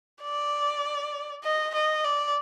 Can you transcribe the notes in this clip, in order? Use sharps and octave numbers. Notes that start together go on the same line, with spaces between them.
D5
D#5
D#5
D5